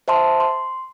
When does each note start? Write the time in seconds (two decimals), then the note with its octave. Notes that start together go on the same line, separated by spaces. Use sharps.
0.08 C5 E5 A5 C6
0.40 C6